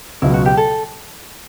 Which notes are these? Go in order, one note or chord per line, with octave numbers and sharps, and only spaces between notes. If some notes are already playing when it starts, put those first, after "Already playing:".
C#2 B2 F#3 E4
F#4
G4
A4